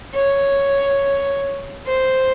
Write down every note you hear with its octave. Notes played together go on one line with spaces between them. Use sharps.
C#5
C5